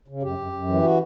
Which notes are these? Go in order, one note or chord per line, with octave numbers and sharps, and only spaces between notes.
C#3
F#2 G4
F#2
F#2
E3
F#4